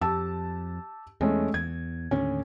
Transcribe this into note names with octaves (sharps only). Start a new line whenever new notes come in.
F2 G4 A5 E6
E2 G#3 A3 C#4
E2 G#6
D#2 A2 D3 C#4